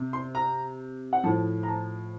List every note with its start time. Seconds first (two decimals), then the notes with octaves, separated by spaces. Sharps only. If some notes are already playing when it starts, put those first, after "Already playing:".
Already playing: C3
0.13 C6
0.35 A#5
1.13 F#5
1.24 A2 F3 A5
1.63 A#5
1.68 A5